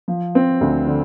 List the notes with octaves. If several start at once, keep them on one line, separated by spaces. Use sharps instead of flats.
F3
C4
D2
D3